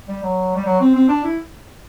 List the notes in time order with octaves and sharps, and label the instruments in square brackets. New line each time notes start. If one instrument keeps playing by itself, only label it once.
[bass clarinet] G3
F#3
G3
F#3
C4
C4
D4
E4